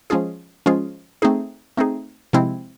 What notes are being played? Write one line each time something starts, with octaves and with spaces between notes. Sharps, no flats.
F3 G#3 C#4 F4 G#4
F3 G#3 C#4 F4 G#4
A3 C4 D#4 G#4
A3 C4 D#4 G#4
C3 F3 G#3 C4 E4